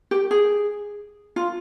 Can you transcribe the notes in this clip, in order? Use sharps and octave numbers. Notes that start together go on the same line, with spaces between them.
G4
G#4
F4